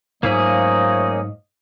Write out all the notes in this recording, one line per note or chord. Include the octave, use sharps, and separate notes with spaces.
G#2 F3 F#3 A3 A#3 C#4 G#4 D#5